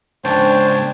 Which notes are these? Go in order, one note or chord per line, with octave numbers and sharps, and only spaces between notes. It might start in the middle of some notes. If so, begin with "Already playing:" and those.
G#2 C#3 D4 C5 C#5 G5 A5